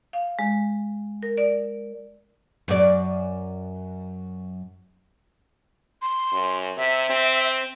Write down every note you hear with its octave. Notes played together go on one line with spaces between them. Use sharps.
F5
G#3
A#4
D5
F#2 D5
C6
F#2
C3 E5
C4